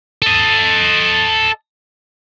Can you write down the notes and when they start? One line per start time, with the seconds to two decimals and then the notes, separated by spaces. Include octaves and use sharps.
0.22 A4 D#5